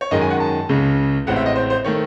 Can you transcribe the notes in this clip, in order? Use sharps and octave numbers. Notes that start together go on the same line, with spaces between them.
C#5
F#2 D#3 G#3 D#5
G#5
F#5
A5
C#2 C#3 G#3 C#4
A1 A2 G#3 C4 F#5
E5
D#5
C5
C5
D#3 A3 C#5